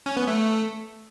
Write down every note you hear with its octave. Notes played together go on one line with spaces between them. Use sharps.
C#4
B3
A3